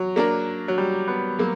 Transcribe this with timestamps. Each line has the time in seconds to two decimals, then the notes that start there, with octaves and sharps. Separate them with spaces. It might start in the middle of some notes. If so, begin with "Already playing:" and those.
Already playing: F#3
0.16 A#3 D4 A#4
0.68 F#3
0.78 G3
1.08 B3
1.39 F#3 A#3